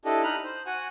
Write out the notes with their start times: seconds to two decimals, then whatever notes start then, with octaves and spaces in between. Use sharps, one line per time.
0.05 D4 E4 G4 A4 D#5
0.23 D#4 D#5 A#5 B5 F6 F#6
0.44 C5
0.66 F#4 F#5 G#5